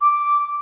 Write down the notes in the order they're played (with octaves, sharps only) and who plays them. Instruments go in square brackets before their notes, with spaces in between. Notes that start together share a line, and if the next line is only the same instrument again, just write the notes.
[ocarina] D6